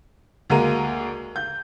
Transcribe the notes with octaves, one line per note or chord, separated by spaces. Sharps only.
D2 G#3 A#3 A#5 D#7
G6